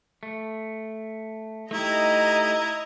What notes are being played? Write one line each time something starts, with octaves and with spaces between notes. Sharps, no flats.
A3
A3 D#4 E4 G4 D#5 A#5